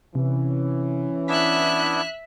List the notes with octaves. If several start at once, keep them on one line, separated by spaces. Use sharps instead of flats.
C3 E3 C#4
B3 D4 E4 E5 F#6 B6